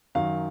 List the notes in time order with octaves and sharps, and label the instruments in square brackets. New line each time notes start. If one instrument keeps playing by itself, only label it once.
[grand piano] F#2 D#3 F#3 F5